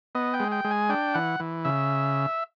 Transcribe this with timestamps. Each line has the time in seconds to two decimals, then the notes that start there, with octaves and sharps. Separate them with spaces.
0.15 B3 D#5
0.34 G5
0.40 G#3
0.52 G5
0.65 G#3
0.71 G#5
0.89 D4 G5
1.14 E3 F#5
1.40 E3
1.65 C#3 E5